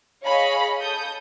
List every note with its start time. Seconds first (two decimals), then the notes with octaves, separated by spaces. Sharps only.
0.24 G#4 C#5 D#5 F5 B5
0.80 A4 D#6 G6